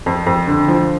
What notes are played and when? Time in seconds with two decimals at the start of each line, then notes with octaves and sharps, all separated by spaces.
0.06 F2
0.27 F2
0.47 D3
0.68 F3